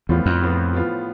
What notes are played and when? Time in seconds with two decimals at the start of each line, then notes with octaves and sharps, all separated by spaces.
0.09 E2 A2 F3 B3 F4
0.26 F2
0.41 A2 F3 B3 F4
0.72 A2 F3 B3 F4